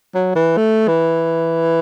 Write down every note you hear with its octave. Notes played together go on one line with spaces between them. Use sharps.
F#3
E3
A3
E3